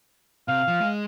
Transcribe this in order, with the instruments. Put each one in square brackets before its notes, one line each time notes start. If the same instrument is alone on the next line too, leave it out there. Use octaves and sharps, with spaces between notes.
[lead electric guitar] C3 [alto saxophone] F5
[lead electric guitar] F3
G#3